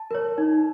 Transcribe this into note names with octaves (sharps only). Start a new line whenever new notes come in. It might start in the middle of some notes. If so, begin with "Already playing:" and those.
Already playing: A5
A#4 C#5
D#4